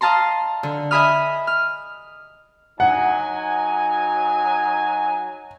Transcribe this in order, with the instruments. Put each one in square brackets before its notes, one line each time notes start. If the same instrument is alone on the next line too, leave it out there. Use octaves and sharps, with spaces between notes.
[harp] D#5 F5 A5 A#5 C6
D3
D#5 E5 G#5 B5 D#6 F6
F6
[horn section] F#3 D#4 G#5 [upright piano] F#5